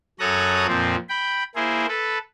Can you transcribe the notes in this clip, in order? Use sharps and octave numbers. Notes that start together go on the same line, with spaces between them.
F#2 A4 C#5 A#5 D#6 F#6
F2 A#2 F3 C4
G5 B5
A#3 E4 G#4 C5
A4 B4